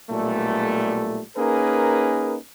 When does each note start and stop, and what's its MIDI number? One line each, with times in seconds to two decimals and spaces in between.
0.10 1.20 35
0.10 1.20 46
0.10 1.20 55
0.10 1.20 57
1.36 2.35 58
1.36 2.35 61
1.36 2.35 63
1.36 2.35 68
1.36 2.35 70
1.36 2.35 71